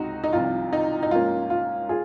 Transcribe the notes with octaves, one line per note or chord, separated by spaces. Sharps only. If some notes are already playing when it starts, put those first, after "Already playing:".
Already playing: C#2 C3 C4 D#4 F#4
D#4
C2 C3 F3 F4
D#4
D#4
G#2 F3 A#3 C#4 F4
F4
F4 G#4